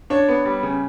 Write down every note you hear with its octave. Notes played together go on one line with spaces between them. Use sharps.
D4 C#5
B3
G3
C#3